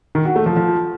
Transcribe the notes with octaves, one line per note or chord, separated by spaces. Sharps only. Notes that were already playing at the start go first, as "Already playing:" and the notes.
D#3
F#4
A3
F3
F3